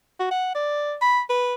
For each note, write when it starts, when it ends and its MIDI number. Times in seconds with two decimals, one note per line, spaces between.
0.20 0.30 66
0.31 0.53 78
0.55 0.95 74
1.01 1.21 83
1.29 1.55 71